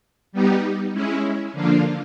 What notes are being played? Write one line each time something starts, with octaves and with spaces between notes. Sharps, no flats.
G3 B3 D#4 G4
G#3 C#4 E4
D3 F3 A#3 D4 F4